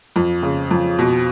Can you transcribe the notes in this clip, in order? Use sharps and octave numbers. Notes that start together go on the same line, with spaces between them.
F2
C#3
F2
B2